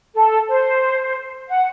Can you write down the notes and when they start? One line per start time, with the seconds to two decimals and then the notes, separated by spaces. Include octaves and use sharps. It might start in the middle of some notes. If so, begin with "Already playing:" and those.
0.14 A4
0.49 C5
1.49 F#5